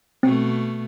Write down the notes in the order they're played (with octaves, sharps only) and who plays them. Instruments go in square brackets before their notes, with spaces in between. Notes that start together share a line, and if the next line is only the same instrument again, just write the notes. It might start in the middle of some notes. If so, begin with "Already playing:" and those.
[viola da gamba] B2 A3 [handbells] C4